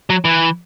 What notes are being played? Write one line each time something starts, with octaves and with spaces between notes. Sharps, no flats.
F#3
E3